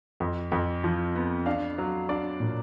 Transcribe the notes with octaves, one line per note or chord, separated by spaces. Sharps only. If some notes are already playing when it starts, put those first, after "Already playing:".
F2
F2
F3
B3
D4 F5
F#3
D4 D5
A#2